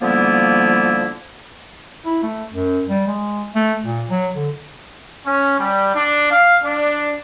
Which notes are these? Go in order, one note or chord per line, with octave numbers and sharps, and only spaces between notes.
D3 F3 G3 A#3 B3 E4
E4
A3
F#2
G3
G#3
A3
A#2
F#3
D3
C#4
G3
D4
F5
D4